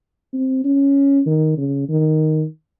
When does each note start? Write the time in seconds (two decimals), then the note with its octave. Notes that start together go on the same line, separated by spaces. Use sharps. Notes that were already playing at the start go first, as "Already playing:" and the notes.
0.33 C4
0.64 C#4
1.26 D#3
1.58 C#3
1.89 D#3